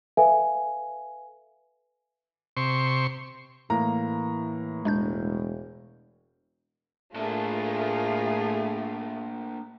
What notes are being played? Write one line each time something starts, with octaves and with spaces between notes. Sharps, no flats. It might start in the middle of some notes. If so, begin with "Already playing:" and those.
A4 B4 E5 F5 G#5
C3 C6 C#6
A2 E3 A#3 A#5
E1 G#3 D4 G6
A2 A3 A#3 D4 F4 G#4 A#4